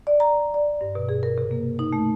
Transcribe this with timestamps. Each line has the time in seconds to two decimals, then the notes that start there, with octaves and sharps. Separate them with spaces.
0.07 D5
0.20 A#5
0.54 D5
0.81 G2
0.95 B2
1.09 G#4
1.23 A#4
1.38 C3
1.51 A#3
1.79 D#4
1.93 A3